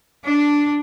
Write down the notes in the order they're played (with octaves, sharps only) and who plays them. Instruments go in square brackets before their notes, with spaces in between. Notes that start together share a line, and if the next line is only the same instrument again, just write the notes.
[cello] D4